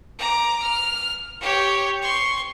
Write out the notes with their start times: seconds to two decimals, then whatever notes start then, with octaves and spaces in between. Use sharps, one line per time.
0.18 A#5 D6
0.62 F6
1.40 G4 C#5
2.02 C6 C#6